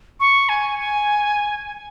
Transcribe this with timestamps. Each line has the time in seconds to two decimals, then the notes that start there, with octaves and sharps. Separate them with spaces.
0.20 C#6
0.49 G#5
0.79 G#5